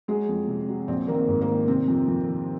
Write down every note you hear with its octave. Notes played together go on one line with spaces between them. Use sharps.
F#3 G#3 G#4
F2
C3
F#3
A#1 C4
D#3 A#3
C4
G#2
A#3
D#3
C3 C4
F2
F2
D#3